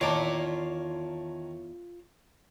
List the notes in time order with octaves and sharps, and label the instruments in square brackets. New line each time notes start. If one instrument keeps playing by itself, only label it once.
[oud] E2 D5 [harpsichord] D#3 [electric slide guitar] F4 A#5 [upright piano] C#5 A5